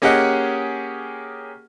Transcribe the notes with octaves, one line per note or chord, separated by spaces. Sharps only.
A#3 C#4 G4 G#4 D#5 F#5